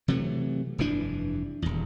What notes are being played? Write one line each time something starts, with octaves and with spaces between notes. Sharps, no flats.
C3 E3 F#3 A3
F1 G2 E3 D4
D#1 E2